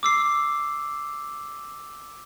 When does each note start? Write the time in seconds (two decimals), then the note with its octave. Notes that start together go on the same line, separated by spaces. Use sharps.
0.03 D6 E6 C7